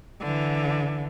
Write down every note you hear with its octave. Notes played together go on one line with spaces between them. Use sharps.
D3 E3